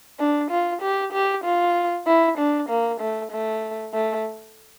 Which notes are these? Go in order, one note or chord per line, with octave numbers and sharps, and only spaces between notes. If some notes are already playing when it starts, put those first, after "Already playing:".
D4
F4
G4
G4
F4
E4
D4
A#3
A3
A3
A3